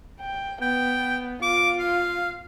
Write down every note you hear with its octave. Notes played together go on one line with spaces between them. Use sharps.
G5
B3 G5
F4 D6
F5